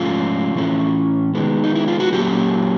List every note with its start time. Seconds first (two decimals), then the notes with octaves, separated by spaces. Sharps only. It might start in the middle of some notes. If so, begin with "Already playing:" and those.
Already playing: G#2 F3 A3 C#4 F4
0.55 A2 E3 A3 C#4
1.35 D#3 G#3 B3
1.63 D#4
1.75 E4
1.88 F4
2.00 F#4
2.12 A#2 F#3 A#3 C#4 G4